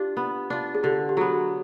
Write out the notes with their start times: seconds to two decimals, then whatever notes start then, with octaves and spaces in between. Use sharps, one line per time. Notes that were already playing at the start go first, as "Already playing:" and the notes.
Already playing: D4 F4 G4
0.17 B3
0.50 D4 F4
0.75 G#4
0.83 D3 G4
1.09 G4
1.17 F#3 B3 G#4